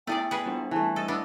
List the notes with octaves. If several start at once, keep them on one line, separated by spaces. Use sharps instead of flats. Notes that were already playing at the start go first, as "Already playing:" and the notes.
A3 B3 E4 G#4 D5 G5
G#4 B4
G3 B3 D4
E3 A3 A5
A4 D#5 E6
B3 D4